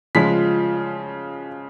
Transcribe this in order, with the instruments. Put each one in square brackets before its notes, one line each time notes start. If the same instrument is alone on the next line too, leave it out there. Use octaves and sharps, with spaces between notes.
[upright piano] C#3 F3 G#3 B6